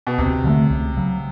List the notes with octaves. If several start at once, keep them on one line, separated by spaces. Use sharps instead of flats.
B2
D2 C3
D3 F3 A3
C#2
C#3 F#3